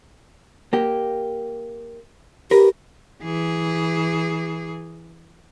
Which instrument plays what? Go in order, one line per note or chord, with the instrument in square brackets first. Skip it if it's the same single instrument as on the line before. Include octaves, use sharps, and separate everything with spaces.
[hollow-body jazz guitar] A#3 G4
[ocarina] G4 [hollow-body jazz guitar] A#4 B4
[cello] E3 G#4